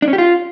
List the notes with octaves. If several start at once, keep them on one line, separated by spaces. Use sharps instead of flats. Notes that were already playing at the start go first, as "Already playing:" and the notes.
D4
C#4
G4
F4